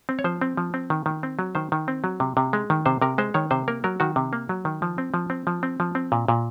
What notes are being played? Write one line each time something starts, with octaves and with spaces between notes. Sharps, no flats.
C4
C#5
F3 C5
C4
F3
C4
D#3
D#3
C4
F#3
D#3 C5
D#3
C4
F#3
C3
C3
G#3
D#3
C3 C5
C3 A#4
G#3 C5
D#3 C#5
C3 C5
A#3 A#4
F#3 A#4
D#3 F#4
C3
A#3
F#3
D#3
F3
C4
F3
C4
F3
C4
F3
C4
A#2
A#2